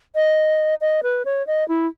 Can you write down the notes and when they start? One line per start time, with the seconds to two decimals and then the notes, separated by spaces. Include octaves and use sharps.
0.15 D#5
0.81 D#5
1.03 B4
1.25 C#5
1.47 D#5
1.68 E4